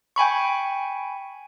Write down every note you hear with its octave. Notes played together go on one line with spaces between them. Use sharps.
G5 G#5 B5 C#6